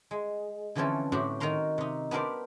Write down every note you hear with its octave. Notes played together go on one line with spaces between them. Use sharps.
G#3
D3 E3 F3 C4 C#4 A4
A2 D4 F#4 G4 C5
D#3 F#4 A#4 A#5 C6
C3 D#4
B3 D4 G4 A#4 C5 D5